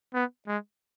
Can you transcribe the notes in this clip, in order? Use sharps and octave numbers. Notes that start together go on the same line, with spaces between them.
B3
G#3